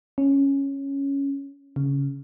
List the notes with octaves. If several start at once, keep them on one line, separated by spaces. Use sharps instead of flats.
C#4
C#3